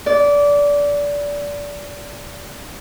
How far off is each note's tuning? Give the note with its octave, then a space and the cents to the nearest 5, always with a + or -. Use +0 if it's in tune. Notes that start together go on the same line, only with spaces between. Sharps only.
D5 -20